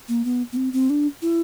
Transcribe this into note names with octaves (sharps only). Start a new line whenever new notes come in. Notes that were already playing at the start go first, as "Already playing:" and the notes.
A#3
B3
B3
C4
C4
D4
E4